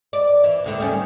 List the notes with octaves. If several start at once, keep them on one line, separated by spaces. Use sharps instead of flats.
D5
E3
D#2 D3 A3
D#3 G3 C#4